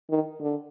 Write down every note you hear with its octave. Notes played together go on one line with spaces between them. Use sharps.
D#3
D3